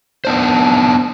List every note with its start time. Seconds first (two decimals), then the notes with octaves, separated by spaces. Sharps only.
0.25 B3 D4 C5